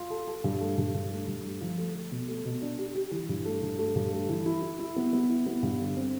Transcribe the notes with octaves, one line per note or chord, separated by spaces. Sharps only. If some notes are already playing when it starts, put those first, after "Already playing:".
Already playing: F4
A4
A4
G2
A3
G2
G2
A3
G2
A3
F3
A3
A3
B2
A3
B2
D4
G4
G4
E3
G2
A3
G2
A3
G2
A3
E3
E4
E4
E4
B3
B3
E4
B3
G2
D3
C4